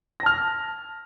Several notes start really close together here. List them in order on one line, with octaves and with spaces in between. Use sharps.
A#6 A5 F6